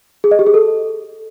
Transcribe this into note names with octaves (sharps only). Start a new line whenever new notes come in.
G#4
D#5
G4
G#4
A4